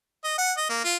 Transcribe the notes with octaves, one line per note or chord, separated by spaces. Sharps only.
D#5
F#5
D#5
A#3
F4